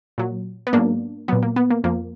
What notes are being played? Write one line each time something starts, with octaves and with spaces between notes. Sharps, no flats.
A#2 F#3
B3
G#2 F#3 A#3 D4
A#2 F#3 B3
A#3
B3
A#3
F2 F3 A#3